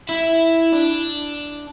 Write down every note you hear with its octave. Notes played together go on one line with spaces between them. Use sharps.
E4
D4